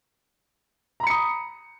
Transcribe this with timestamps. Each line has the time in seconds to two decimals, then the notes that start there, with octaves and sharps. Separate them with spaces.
1.00 A#5
1.03 B5
1.07 C#7
1.10 D#6